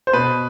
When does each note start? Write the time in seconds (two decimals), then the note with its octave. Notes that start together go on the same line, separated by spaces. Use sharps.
0.07 C5
0.13 B2 B4